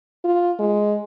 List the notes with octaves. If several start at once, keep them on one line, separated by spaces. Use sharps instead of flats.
F4
G#3